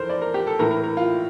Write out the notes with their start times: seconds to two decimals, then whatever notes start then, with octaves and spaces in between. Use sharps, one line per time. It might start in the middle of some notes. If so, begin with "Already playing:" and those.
Already playing: F2 E3 A4 A#4 C5
0.10 D5
0.22 A#4
0.34 G4
0.47 A4
0.59 A2 E3 A#4
0.71 A#4
0.84 A#4
0.97 F4